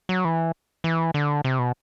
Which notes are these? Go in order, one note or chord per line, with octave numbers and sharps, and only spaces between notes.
F#3
E3
E3
D3
C3
B2